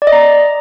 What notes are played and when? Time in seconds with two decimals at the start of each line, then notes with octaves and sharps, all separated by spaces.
0.02 D5
0.07 D#5
0.12 A#5